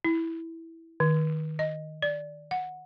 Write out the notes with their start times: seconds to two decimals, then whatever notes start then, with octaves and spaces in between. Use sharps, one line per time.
0.04 E4
1.00 D#3
1.59 D#5
2.02 D5
2.51 F#5